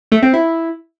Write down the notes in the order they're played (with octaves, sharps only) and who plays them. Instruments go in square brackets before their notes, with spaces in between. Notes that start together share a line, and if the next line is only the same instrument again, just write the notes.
[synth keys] A3
C4
E4